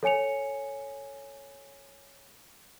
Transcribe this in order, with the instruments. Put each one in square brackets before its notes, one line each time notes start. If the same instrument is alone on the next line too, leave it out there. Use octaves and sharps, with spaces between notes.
[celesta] A4 C#5 G#5 C#7 F7